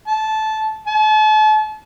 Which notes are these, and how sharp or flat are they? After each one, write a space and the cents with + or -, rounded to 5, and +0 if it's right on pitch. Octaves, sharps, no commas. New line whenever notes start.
A5 -15
A5 -40